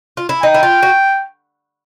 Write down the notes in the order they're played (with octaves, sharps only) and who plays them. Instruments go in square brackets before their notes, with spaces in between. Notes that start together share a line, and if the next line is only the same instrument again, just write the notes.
[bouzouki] F4
E4
[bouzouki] D#4 [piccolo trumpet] G5
[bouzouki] E4
F4
F#4